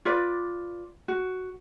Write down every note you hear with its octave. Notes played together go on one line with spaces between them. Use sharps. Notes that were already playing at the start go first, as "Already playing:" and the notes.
F4 B4 D5
F#4